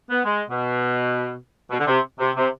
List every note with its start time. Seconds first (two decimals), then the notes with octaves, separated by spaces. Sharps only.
0.10 B3
0.25 G#3
0.50 B2
1.71 B2
1.80 D3
1.87 C3
2.20 C3
2.36 C3